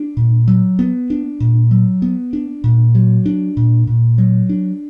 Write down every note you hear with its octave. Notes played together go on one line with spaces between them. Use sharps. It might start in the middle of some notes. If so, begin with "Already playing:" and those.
Already playing: D4
A#2
F#3
B3
D4
A#2
F#3
B3
D4
A#2
F#3
D4
A#2
A#2
F#3
D4